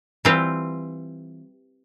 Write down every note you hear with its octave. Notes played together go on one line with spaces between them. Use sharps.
E3 G3 C4 F4